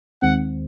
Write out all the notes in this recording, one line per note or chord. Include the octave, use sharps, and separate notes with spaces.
D#2 D#3 G#3 C4 F#5